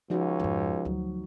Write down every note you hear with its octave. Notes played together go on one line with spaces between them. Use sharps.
C#2 F3 D#4 F#4
F2 G#2
D2 F#3